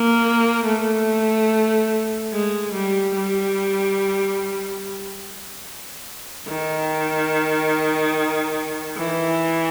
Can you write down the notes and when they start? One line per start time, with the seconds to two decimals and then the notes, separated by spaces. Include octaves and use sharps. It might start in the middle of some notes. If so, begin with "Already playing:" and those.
Already playing: A#3
0.66 A3
2.33 G#3
2.74 G3
3.15 G3
6.48 D#3
8.97 E3